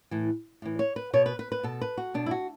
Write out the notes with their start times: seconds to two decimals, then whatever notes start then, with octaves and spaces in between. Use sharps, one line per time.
0.11 A2 E3
0.62 A2 E3
0.79 C#5
0.96 B4
1.13 B2 C#5
1.26 B4
1.39 B4
1.52 B4
1.63 B2 A4
1.81 B4
1.97 F#4
2.14 B2 D4
2.26 E4
2.31 F#4